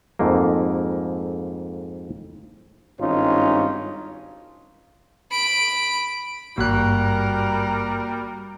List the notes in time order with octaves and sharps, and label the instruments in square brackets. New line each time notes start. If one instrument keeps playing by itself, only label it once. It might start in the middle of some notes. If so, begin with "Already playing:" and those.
[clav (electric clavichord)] F2 G#2 A3 A#3
[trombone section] G#1 G2 C#4 D#4 F4
[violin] B5 D7
[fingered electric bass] G#1 G2 [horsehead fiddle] G3 A#4 [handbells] A#3 F#4 F#6